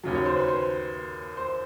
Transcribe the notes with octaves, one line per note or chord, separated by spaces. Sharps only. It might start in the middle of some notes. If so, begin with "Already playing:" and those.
D#2 C#3 F#3
C#5
C5
B4
C5
C5